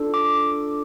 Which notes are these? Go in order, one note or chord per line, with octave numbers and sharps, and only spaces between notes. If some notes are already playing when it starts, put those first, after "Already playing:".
Already playing: D4 F4 A4
D6